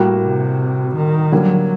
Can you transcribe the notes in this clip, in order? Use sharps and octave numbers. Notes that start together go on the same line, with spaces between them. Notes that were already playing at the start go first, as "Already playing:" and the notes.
Already playing: A2 G3 A#3 F#4
C3
D#3
D3 F#3 G3 A#3